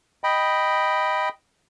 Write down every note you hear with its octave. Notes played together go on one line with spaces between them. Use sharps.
D#5 G5 B5